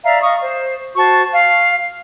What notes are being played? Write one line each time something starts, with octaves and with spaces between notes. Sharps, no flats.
D5 E5 F5 A#5
D#5 F5 C#6 D#6
C5
F#4 C5 A5 C#6
F5